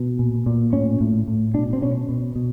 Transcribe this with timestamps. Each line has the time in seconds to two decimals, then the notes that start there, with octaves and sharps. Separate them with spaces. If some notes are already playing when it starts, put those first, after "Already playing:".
Already playing: B2
0.19 A#2
0.46 A#2
0.73 A2 C#4
1.01 A2
1.28 A2
1.54 B2 D4
1.73 C4
1.82 B2 C#4
2.09 B2
2.36 B2